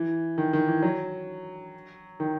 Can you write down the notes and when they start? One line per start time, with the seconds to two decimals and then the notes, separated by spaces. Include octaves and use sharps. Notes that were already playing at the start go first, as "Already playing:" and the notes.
Already playing: E3
0.38 D#3
0.53 D#3
0.68 E3
0.82 F#3
2.20 D#3